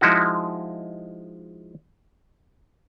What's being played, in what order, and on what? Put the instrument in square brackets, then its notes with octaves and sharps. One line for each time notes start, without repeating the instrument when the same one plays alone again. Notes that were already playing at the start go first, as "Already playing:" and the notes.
[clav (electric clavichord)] F3 G#3 D#4 E4 F#4